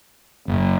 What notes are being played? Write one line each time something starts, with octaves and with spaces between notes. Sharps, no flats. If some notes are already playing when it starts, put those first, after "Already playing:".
F#1